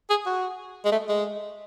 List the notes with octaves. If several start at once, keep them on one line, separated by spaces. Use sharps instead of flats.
G#4
F#4
G#3
A3
G#3